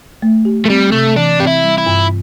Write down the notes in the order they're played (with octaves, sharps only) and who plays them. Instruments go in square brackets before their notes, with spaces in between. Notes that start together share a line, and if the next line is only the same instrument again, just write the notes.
[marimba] A3
G4
[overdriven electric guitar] A3
[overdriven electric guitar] G3 [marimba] C4
[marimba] C3 [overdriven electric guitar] A3
[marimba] E3 [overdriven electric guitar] D4
[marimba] C4 [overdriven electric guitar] G4
[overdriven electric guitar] E4
[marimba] G3
[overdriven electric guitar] E4
[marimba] G2